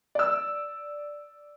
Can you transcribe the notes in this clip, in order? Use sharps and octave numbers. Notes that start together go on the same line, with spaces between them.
D5 E6